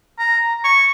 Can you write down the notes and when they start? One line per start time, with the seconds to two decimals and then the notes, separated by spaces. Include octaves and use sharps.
0.19 A#5
0.64 C#6